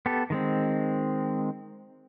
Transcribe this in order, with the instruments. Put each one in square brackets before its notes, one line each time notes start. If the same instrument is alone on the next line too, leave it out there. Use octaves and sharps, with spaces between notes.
[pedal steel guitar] B3 G4 A4
D#3 G#3 C4